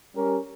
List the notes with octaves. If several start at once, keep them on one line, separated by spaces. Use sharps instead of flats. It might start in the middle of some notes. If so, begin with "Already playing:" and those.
G3 C#4 G4 A#4